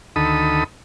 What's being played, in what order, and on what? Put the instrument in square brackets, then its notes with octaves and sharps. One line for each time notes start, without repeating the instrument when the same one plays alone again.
[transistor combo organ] D2 D#3 A4 B5 D#6